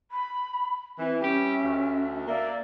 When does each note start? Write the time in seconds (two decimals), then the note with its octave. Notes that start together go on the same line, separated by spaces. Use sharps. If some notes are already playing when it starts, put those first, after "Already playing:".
0.11 B5
0.99 E3 C4 E5
1.21 G3 C#4 G4
1.63 D2
2.28 A#3 D5 E5